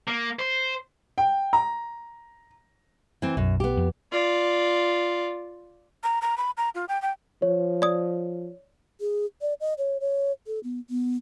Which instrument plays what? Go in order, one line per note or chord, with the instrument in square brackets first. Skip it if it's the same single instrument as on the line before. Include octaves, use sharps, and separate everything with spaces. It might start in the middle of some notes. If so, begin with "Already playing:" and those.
[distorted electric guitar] A#3
C5
[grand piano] G5
A#5
[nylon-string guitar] E3 C4
[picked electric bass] B1 [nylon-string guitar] F#2
[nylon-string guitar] B3 G4
[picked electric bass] F2
[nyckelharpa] F4 D5
[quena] A#5
A#5
B5
A#5
F4
G5
G5
[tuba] F3 [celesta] C#5
[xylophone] D5 D#6
[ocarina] G#4
D5
D#5
C#5
C#5
A4
B3
B3